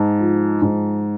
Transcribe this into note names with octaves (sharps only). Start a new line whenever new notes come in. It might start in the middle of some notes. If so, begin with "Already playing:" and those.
Already playing: G#2 A5
F3
G#2